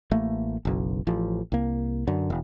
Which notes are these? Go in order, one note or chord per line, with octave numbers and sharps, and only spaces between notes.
A1 A3 A#3
F#1 B1
A1 F3
C2 A#3
F#2 D3
E1